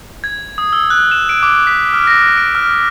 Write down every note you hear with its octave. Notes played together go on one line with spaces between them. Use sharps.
G#6
D#6
E6
F#6
E7
D7
D6
B6
F6
A#6
D7
F6